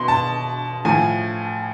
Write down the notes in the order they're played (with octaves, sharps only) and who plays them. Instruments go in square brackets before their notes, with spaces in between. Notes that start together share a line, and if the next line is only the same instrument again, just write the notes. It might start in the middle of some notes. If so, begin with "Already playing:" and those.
Already playing: [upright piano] B2 C6
A5
A2 F3 G#5